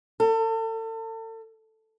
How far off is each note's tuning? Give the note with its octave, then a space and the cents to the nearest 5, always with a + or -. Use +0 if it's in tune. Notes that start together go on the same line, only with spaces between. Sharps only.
A4 +35